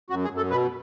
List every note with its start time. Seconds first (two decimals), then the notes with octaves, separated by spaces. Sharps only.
0.10 F#2 F#4
0.24 G#4
0.30 F#2
0.37 A4
0.50 B2 B4